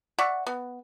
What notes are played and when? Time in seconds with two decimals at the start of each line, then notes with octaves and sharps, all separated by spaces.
0.18 D5 E5 F#5 C#6
0.46 B3